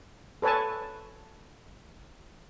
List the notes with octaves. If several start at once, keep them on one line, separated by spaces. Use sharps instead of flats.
A4 B4 C#5 G#5 A5